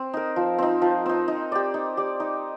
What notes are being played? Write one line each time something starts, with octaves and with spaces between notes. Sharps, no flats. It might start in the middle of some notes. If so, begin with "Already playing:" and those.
Already playing: C4
D#4 A#4
F3
C4 D#4
F3
C4 D#4
D#4
G4 D5
D#4
G4 D5
D#4